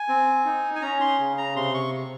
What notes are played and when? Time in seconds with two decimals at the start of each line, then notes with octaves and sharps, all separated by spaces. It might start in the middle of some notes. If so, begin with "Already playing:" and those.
Already playing: G#5
0.09 C4
0.45 D#4
0.76 G#5
0.82 C#4 A#5
1.01 C6
1.19 C#3
1.38 A#5
1.56 C3 C6
1.74 C#6